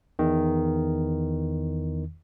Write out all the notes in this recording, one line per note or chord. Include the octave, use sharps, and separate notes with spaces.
E2 D#3